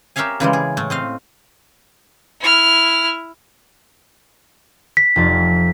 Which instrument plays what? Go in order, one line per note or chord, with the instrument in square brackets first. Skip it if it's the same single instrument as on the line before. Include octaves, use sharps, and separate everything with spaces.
[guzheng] G4 A#4 C#5 E5 F5 G#5
C#3 E3 G3 G#3
G#4
A2 A3
C4 D#5 F5
[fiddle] E4 F6
[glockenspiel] B6
[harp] F1 F2 A6